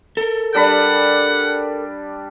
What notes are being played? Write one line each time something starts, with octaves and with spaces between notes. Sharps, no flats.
A4 A#4
G3 D4 F#5 B5